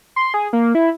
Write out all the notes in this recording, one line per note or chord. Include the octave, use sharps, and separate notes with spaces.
C6
G#4
A#3
E4